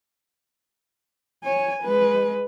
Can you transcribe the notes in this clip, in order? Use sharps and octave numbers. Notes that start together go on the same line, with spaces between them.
C#5 G#5
G#3 B4